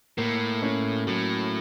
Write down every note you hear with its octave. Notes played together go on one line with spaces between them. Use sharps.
A2 A#3
C#4
A2 F#3